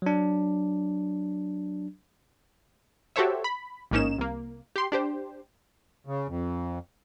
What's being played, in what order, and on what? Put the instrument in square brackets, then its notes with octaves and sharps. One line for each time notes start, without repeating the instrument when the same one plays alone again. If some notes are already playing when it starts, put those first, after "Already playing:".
[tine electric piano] F#3 D4
[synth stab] F#4 G4 A4 C5 C#5 E5
B5
A1 G#2 A#3 C#4 D#4 E7
C2 A#3
G4 C6
D4 G4 C5
[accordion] C#3
F2